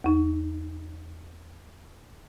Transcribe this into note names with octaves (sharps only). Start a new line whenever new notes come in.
E2 D#4